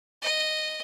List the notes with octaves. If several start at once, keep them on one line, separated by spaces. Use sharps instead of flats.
D#5